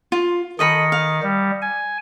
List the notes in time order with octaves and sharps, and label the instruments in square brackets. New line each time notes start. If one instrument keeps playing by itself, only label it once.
[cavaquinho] F4
[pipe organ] D#3 [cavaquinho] A4 D#5 B5 [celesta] D#6 A#6 C#7
[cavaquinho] F5
[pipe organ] G3
G#5